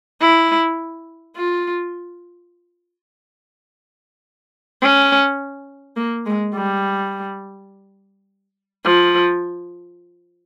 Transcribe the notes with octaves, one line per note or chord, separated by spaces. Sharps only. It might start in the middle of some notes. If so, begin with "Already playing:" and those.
E4
F4
C#4
A#3
G#3
G3
F3